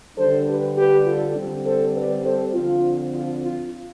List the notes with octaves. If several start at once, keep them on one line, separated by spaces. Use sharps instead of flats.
D3 G3 D4 A4 C5
G4 B4
G4 B4
F4 A4
D3 G3 C4
A4 C5
B4 D5
A4 C5
D3 F3 C4 F4
F4
F4